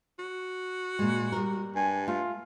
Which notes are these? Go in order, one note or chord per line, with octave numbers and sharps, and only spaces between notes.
F#4
A#2 G#3
G3 A#4
G2 G#5
A3 F4